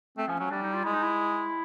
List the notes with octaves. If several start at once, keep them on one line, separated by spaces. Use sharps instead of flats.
A3 C4
F3 C#4
F#3 C#4
G3 D4
D#4
F4
G#3 E4
D#4
E4